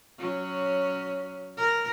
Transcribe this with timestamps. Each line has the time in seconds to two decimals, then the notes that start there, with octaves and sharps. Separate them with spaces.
0.18 F#3 C#4
1.57 A#4